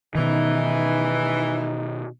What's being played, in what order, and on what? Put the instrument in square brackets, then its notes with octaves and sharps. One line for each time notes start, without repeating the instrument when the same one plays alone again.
[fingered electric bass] B2 D#3 [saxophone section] E3 [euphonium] D#4